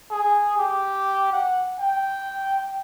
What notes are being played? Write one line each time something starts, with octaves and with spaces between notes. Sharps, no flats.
G#4
G4
F#5
G5